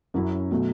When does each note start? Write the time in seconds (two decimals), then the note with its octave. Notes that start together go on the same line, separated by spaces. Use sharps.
0.14 F#2 F#3 C#4 E4
0.51 B2 F#3 A3